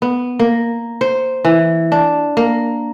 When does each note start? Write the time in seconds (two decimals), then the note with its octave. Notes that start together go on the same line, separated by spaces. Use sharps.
0.02 B3
0.39 A#3
1.01 C5
1.44 E3
1.92 D4
2.37 A#3